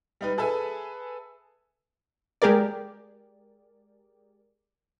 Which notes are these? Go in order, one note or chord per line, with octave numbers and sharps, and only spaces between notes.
G3 D#4 B4
G#4 A4 B4 E5 G#5
G#3 G4 G#4 A#4 D5